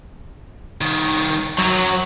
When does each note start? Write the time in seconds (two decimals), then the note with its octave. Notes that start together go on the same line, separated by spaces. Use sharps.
0.81 C2 D#3
1.59 F#2 F#3